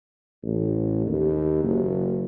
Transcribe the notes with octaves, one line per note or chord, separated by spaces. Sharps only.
A1
D#2
F#1